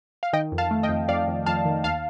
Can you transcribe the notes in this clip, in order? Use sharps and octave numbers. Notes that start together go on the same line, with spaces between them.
F5
D#3 D#5 G5
F2
F5 A5
A3
D#5 G5
F2
F2 D5 F5
F2
F2 F5 A5
D#3
D#2 F5 A5